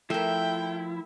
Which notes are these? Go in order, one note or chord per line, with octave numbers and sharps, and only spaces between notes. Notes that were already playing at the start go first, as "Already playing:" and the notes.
F3 A3 E4 A#4 E5 G5